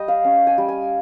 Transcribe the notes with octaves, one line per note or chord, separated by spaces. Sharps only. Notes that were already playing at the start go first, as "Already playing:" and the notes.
Already playing: G3 D#5 G5
F5
C#4
G#5
G3
G#5